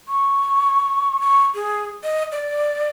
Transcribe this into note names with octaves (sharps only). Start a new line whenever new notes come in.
C#6
C#6
G#4
D#5
D5